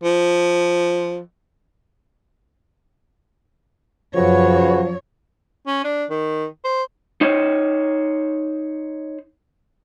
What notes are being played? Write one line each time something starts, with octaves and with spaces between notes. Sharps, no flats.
F3
F#2 C#3 F3 F#3 F#4 B4 C#5
C#4
D4
D#3
C5
D#4 C5 C#5